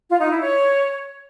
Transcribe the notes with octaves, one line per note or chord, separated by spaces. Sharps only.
F4
D#4
E4
C#5